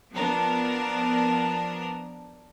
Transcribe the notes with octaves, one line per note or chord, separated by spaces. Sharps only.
F3 B3 D4 A#4